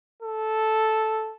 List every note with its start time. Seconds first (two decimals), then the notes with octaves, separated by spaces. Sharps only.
0.22 A4